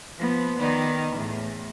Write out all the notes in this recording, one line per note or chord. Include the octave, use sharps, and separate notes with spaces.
F3 B3
D#3 B3 D#4 D5
E2 A2